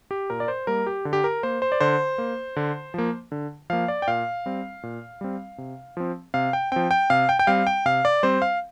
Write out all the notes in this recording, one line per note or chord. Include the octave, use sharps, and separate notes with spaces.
G4
A#2 A#4
D5
C5
G3 A#3 A#4
G4
D3
G4
A#4
A#3 C5
C5
D5
D3 C5
A#3
D3
F3 A#3
D3
F3 A#3 F5
D5
G5
A#2 F5
G3 C4
A#2
G3 C4
C3
F3 C4
C3 F5
G5
F3 C4 G5
G5
C3 F5
G5
G5
G3 C4 F5
G5
C3 F5
D5
G3 C4 C5
F5